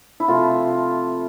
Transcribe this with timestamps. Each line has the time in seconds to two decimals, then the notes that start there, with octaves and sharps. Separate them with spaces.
0.20 E4
0.28 C3 F3 A3 F4